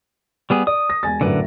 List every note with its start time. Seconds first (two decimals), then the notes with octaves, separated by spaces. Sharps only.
0.50 G3 B3 G#4
0.67 D5 D#6
0.90 A#6
1.03 E1 G#5 A6
1.21 F#2 A2 D3 B4